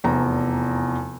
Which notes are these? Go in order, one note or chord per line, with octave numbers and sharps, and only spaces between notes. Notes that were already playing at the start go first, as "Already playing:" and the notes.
F1 E2 A#5